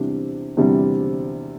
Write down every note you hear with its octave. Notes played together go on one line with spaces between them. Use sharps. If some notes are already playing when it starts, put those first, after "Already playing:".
Already playing: E2 C3 G3 D4
E2 C3 G3 D4